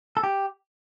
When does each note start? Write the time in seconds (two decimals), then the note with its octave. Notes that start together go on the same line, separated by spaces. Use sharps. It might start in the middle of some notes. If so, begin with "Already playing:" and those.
0.17 A4
0.23 G4